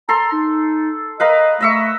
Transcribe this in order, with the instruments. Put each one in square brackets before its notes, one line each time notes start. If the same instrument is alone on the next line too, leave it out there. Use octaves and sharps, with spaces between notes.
[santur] A4 C6 [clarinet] A#5
[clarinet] D#4
[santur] A#4 B4 F5 [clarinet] D#5
[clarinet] A3 [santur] D#5 E5 C#6